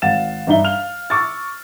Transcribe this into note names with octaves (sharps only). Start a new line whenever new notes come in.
G#1 F5 F#5 A6 E7
G2 D4 D#4 E5 G7
F5 F6 F7
C#6 D6 E6 F6 A6